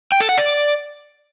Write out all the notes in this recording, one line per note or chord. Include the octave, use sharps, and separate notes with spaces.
G5
A4
F#5
D5